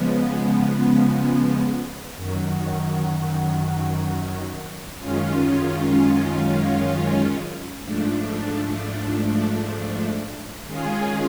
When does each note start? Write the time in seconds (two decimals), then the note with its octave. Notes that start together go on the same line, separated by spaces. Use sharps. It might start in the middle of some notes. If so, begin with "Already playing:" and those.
Already playing: C#3 F3 G#3 B3
2.16 F#2 D#3 F#3
4.98 F#2 D#3 G#3 C#4 F4
7.82 G#2 F3 A3 D4
10.64 D#3 G#3 C#4 F4 G#4